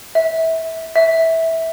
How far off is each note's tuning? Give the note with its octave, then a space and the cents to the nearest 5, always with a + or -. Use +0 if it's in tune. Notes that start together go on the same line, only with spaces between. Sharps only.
E5 -25
E5 -15